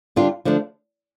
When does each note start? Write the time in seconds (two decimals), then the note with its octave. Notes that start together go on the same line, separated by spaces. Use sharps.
0.16 D3 G3 D4 F4
0.45 D3 F3 A3 D4